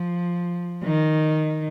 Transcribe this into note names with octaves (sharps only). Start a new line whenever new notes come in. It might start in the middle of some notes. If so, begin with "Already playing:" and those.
Already playing: F3
D#3